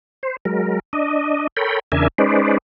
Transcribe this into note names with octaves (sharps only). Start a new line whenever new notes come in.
C5
F#3 G#3 A#4
D4 D#5
A4 A#4 C#5 G5 B5
E2 C#3 D4 A#4 E5 G#5
G#3 C#4 D#4 B4 C5 D5